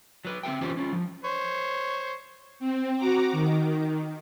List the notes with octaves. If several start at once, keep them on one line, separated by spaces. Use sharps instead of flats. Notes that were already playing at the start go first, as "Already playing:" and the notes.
F#3 B4
C4 D#4 E5 G5
E3 C#4 F4 G4 C5
C#4 F4
F3
C5 C#5
C4
F#4 A#5 D6
D#3